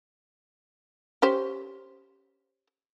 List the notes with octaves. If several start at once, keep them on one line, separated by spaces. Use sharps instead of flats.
C#4 G4 C5